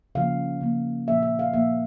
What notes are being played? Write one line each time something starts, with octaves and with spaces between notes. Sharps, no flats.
C#3 F3 A#3 F5
C#3 F3 A#3
A#2 F3 A#3 E5
E5
F5
A#2 F3 A#3 E5